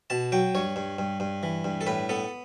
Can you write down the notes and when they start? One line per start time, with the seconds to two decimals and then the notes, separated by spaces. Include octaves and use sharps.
0.10 B2 A5
0.32 F#3 G5
0.55 G2 C#5
0.76 G2
0.99 G2
1.20 G2
1.43 E3
1.64 G2
1.81 A4
1.87 A2 B4
2.09 B3 A4